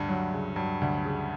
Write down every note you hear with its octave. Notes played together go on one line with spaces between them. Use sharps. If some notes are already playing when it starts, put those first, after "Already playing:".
Already playing: D2 G2
F#3
C#3
G2 F#3
D2
C#3